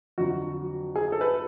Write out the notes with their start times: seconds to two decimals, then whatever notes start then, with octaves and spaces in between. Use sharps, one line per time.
0.18 F2 D3 F#3 F#4
0.96 G#4
1.12 A4
1.21 B4